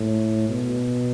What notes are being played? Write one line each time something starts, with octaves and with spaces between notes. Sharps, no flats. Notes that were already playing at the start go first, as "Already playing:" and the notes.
Already playing: A2
B2